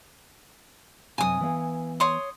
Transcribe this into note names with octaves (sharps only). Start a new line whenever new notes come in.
F#2 C3 G#5 D#6
E3 B3 F5
C#5 C6 D#6